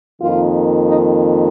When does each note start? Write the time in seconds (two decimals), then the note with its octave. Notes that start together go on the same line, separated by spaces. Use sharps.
0.20 F2 D#3 A#3 F4
0.87 D#4